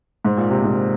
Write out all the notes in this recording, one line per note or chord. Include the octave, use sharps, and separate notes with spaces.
G#2
A#2
C3
G#2